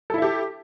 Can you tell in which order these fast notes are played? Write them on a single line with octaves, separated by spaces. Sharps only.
A4 E4 E5 G4